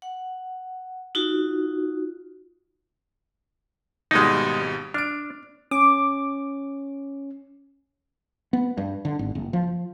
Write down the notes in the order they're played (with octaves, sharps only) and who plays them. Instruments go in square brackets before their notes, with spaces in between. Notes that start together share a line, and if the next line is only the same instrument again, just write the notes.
[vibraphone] F#5
D#4 F4 F#4
[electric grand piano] G#1 B2 G3 [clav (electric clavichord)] G#3 D#4
[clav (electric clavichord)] D4 [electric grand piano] F6 D7
[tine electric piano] C#4 [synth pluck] D6
[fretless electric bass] B3
G2
D3
G#1
F#1
F3